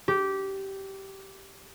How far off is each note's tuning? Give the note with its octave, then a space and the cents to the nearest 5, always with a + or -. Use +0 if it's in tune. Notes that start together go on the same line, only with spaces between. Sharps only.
G4 -15